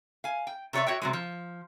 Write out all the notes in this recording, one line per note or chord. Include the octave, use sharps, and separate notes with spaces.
F5 G#5
G5
C3 G4 C#5 D5 E5
F#4 C#5 E5 G5
C3 F#3 G#3
F3